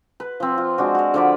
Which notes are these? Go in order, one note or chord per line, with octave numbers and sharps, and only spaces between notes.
B4
F3 C4
F4
G#3 D4 F#4
F#4 F5
D3 F3 D5 B5